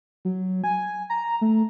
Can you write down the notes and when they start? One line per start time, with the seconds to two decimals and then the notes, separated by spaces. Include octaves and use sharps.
0.25 F#3
0.64 G#5
1.10 A#5
1.41 A3